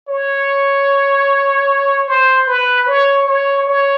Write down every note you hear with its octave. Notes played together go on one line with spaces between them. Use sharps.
C#5
C5
B4
C#5
C#5
C#5